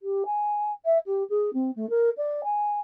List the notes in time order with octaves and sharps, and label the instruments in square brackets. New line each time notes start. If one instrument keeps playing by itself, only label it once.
[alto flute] G4
G#5
E5
G4
G#4
C4
A3
A#4
D5
G#5